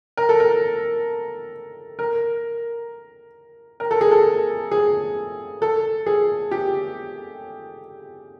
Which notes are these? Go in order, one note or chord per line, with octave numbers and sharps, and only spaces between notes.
A#4
A4
A#4
A#4
A#4
A4
G#4
A4
G#4
A4
G#4
G4